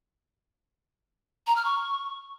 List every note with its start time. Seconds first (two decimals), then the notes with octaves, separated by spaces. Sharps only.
1.47 A#5
1.56 F6
1.65 C#6